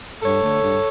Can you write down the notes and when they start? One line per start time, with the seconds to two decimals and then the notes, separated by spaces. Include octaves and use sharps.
0.23 G2 A4 C#5
0.42 D3 A3
0.62 G2